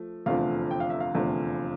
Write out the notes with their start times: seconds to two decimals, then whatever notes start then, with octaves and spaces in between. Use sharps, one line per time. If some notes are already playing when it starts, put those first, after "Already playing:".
Already playing: F3 A3
0.26 F1 E2 D3 F3 A3 F5
0.71 G5
0.80 F5
0.90 E5
1.00 F5
1.14 F1 E2 D3 F3 A3